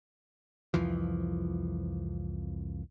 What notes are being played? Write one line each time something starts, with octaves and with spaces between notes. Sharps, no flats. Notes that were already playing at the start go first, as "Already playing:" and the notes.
C2 F2 E3 F3